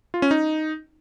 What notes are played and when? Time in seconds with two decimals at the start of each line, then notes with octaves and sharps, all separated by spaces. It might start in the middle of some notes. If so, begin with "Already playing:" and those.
0.14 F4
0.22 C#4
0.31 D#4